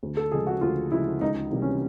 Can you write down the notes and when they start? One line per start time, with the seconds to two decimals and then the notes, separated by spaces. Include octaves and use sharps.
0.03 D2
0.17 A4
0.32 C#3 F3 G#3 G#4
0.47 F#4
0.61 D2 F4
0.92 C#3 F3 G#3 E4
1.21 C#2 D#4
1.52 C3 E3 G3 A#3
1.62 C#4